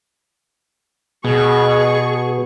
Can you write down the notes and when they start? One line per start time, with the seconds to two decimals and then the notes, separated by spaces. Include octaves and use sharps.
1.25 B2 G#4 C#6